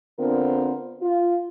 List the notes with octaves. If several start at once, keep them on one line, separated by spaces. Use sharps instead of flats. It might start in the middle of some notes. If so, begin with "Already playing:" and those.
D3 B3 C4 F4 A#4
F4